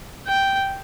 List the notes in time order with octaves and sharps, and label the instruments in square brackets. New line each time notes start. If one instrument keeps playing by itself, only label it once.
[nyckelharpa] G5